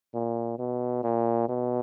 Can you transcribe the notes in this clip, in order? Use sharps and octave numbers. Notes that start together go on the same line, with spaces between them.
A#2
B2
A#2
B2